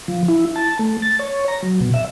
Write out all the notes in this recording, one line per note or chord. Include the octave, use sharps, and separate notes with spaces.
F3
E4
A5
A3
A6
C#5
A#5
F#3
B2
E5